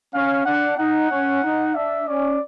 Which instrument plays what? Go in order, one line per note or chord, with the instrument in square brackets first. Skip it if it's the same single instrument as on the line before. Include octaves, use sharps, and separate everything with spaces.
[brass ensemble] C#4 [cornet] F5
[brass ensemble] D4 [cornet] F#5
[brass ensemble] D#4 [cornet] F#5
[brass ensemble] C#4
D#4
[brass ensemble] D4 [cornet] E5
[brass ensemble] C#4 [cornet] D5